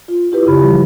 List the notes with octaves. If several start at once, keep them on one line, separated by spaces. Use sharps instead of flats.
F4
E4 G4 B4
F#2 C#3 B5
E3 F3 G3